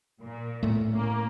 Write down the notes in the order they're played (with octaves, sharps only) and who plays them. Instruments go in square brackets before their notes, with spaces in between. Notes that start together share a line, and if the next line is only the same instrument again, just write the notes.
[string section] A#2
[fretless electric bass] A2 A3
[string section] A#3 C#4